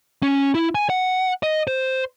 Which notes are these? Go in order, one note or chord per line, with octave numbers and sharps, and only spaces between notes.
C#4
E4
G#5
F#5
D#5
C5